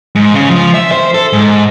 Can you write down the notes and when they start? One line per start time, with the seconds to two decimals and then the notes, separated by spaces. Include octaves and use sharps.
0.15 G#2
0.34 C#3
0.50 F3
0.74 E5
0.92 C5
1.14 A4
1.33 G#2